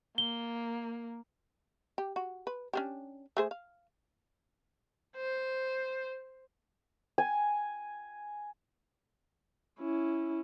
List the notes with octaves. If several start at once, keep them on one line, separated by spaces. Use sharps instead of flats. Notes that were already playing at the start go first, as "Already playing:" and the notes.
A#3 G7
G4
F#4
B4
C#4 D4 G4
A3 G#4 C5
F5
C5
G#5
C#4 E4